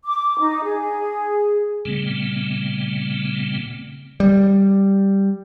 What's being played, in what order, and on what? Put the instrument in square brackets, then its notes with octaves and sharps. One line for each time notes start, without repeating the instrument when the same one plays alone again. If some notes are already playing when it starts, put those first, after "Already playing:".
[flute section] D6
D#4
G#4
[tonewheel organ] A#2 C#3 G3 A3 B3 C4
[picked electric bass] G3